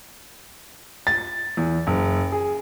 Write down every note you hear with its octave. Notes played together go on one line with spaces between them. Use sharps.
A6
E2
F#1
G#4